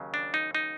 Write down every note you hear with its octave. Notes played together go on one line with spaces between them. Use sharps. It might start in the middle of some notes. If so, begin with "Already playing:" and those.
Already playing: D#2 C#3 F#3
D4
D#4
D#4